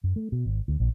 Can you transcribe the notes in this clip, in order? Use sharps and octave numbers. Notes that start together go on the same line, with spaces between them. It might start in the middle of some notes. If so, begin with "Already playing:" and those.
F#2
A3
B2
G#1
D2
A#1